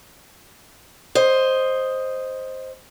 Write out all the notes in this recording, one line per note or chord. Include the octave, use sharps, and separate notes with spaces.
C5 D#5